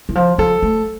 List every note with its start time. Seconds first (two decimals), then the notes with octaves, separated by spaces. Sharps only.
0.09 E3
0.15 F3
0.38 F3 A4
0.63 A3